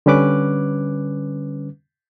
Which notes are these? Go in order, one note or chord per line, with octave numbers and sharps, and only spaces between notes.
D3 G3 C#4 B4 D6 F#6